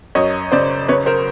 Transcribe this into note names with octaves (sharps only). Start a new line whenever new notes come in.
F#2 C#5 D#5
C#3 C5 D5
C#3 B4 C#5
A#4 C5